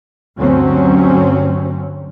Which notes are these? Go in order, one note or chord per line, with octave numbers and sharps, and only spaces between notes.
D2 G2 D3 F#3 C4 C#4